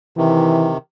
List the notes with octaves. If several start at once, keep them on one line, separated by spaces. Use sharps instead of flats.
C3 D#3 E3